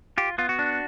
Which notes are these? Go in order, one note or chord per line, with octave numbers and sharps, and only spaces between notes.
F4 G4
B3 F4
F#4
D4